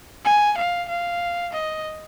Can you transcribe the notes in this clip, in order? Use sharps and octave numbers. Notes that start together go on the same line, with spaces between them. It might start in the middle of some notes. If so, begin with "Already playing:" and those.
G#5
F5
F5
D#5